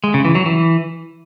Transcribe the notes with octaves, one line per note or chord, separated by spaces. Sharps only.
G#3
C#3
E3
F#3
E3